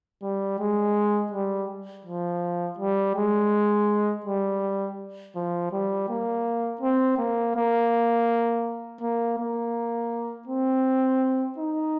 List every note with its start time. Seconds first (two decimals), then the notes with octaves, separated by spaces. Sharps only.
0.22 G3
0.59 G#3
1.32 G3
2.05 F3
2.79 G3
3.16 G#3
4.26 G3
5.36 F3
5.72 G3
6.09 A#3
6.81 C4
7.18 A#3
7.56 A#3
9.01 A#3
9.39 A#3
10.48 C4
11.58 D#4